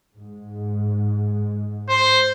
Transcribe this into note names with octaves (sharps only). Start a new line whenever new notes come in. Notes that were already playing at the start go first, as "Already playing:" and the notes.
G#2
C5